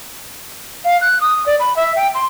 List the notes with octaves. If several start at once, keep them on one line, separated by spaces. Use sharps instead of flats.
F5
F#6
D#6
D5
B5
E5
G5
C6